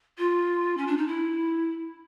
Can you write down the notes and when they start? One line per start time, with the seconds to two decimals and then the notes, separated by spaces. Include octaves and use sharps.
0.18 F4
0.77 C#4
0.87 D4
0.97 D#4
1.07 E4